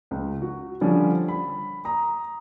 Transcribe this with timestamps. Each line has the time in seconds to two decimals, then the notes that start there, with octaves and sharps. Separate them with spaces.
0.11 C#2
0.42 F#4
0.81 D3 F3 G3 C#4
1.28 B5
1.85 A#5 D#6